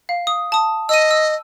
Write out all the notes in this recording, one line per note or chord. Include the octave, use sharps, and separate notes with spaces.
F5
D#6
A5 D#6
D#5 E6 D#7
E6